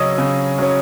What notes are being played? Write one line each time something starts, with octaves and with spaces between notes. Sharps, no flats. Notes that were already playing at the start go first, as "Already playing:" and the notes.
Already playing: C#3 F#3 C#4 D#5 D#6 E6
C#3
F#3 C#4